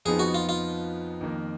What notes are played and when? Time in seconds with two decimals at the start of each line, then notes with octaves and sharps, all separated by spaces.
0.05 F2 F3 B3 D#4 G#4
0.19 F#4
0.34 F4
0.49 F4
1.21 F2 D#3 A#3